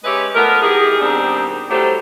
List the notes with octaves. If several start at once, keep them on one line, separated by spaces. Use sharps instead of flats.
G#3 C#4 G4 B4 D#5 E5
F3 A3 B3 A#4
E3 D#4 G4 G#4
B2 D#3 G3 C4 D4 G#4
A2 F#3 G3 A3 G4 C5